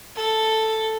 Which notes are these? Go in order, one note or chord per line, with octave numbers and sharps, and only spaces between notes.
A4